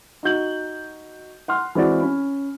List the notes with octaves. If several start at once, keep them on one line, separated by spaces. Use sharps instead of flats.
D#4 F#4 G6 F#7
F#5 C6 F6
E3 G#3 C4 E4 F#4 D5
C#4 B5